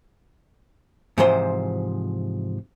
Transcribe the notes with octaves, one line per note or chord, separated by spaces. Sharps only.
G#2 C3 E3 F3 C5 C6